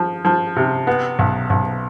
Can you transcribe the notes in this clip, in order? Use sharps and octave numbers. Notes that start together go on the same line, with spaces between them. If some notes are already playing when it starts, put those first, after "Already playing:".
Already playing: F3
F3
C3
B3
B1
B1